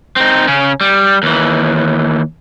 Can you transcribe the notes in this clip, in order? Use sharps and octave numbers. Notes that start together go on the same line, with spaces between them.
C4 D#4
C#3 C#4
G3
D#2 E3